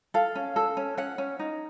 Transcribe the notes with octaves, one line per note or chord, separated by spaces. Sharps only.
A4 F5
C#4
A4
C#4
C#4 F#5
C#4
D#4